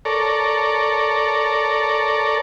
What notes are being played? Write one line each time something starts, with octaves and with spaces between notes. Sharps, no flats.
A4 A#4 C#5 D5